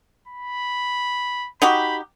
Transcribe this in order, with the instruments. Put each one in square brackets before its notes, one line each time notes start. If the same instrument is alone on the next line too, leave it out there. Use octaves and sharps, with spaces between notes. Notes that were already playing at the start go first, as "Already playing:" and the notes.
[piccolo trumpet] B5
[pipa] D#4 F#4 G4 [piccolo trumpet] B5